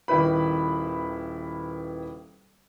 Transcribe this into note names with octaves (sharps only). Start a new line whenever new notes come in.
D#1 D#3 E4 B4 B5